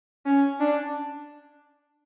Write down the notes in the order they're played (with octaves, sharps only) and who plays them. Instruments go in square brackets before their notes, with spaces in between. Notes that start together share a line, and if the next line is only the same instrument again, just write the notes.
[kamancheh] C#4
D4